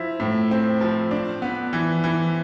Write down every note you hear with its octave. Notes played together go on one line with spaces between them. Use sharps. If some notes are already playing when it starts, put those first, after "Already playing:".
Already playing: F3 E4
A2
C4
F3
D4
B3
E3
E3